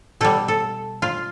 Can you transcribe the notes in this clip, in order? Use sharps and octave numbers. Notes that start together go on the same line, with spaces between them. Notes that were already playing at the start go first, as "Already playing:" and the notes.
B2 G3 A4
A4
F4